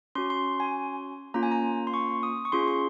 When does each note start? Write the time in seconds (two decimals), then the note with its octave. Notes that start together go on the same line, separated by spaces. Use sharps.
0.15 C#4 F#4 C6
0.30 C6
0.60 G#5
1.34 A#3 C#4 F4 A#5
1.43 G#5
1.52 A#5
1.87 C6
1.94 C#6
2.23 D#6
2.45 C#6
2.52 C#4 F4 G#4 C6
2.68 C6